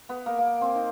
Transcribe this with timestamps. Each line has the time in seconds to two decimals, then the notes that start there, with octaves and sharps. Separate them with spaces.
0.09 B3
0.26 A#3
0.39 A#3
0.61 C4
0.75 D#4